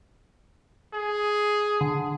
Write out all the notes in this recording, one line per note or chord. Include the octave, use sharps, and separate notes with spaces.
G#4
D3